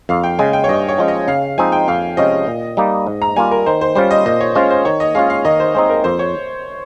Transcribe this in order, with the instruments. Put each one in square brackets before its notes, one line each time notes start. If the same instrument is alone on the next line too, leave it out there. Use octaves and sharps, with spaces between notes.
[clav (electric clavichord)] F2 [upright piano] F5
[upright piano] G5
[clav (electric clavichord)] C#3 G#3 [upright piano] G#5
[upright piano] G5
C#5
[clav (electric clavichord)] G2 [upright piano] D#5
[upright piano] C#5
[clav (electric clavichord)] F3 G#3 C#4
[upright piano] D#5
[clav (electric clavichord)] C#3 [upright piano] F5
[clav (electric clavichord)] F3 G#3 C4 D#4 [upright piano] G#5
[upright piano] G5
[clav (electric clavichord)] F2 [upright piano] F5
[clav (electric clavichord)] C3 F3 G#3 C#4 [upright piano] D#5
[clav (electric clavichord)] A#2
G3 A#3 D#4
G#2
[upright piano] A#5
[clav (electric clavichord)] G3 A#3 F4 [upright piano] G#5
[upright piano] A#4
[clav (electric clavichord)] D#3 [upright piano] C5
[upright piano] C5
[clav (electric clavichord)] G3 C#4 F4 [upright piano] C5
[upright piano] D#5
[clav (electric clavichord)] A#2 [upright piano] D#5
[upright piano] C#5
[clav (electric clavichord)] G#3 C#4 F4 [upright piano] C5
[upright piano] C5
[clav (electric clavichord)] D#3 [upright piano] C#5
[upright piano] D#5
[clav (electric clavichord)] G#3 C#4 F4 [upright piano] F5
[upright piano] F5
[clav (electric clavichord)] D#3 [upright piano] D#5
[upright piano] C5
[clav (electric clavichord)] G#3 C4 D#4 [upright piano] C5
[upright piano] A#4
[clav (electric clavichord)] F2 [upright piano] C5
[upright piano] C#5